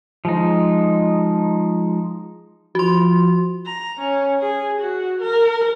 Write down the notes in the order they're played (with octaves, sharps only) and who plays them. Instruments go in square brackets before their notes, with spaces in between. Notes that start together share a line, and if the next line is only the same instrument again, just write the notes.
[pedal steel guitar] F3 G#3 D#4
[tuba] F3 [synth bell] F#4 C6
[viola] A#5
C#4
G#4
F#4
A#4